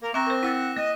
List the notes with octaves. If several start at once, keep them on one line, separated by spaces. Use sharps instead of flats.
A#3 A#4
C4 E5 A#5 C#6 D6 F#6 A#6
A#4 C5
E4 F#5 E6 A6 B6
A#3 D#5